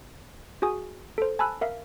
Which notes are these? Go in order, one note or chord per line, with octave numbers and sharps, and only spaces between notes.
F#4 G#4 G#5 D#6
A4 C5
G#5 A5 B5 E6 F#6
A#4 E5 F5